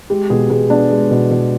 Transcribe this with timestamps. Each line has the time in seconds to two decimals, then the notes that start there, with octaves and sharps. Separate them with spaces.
0.10 G#3 G4
0.30 B2 G#4
0.50 B2 G#4
0.70 B3 D4
0.90 G#3
1.11 B2
1.31 B2